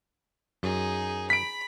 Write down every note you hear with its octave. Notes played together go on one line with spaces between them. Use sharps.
F#2 D#4 G#4
B5 B6 D7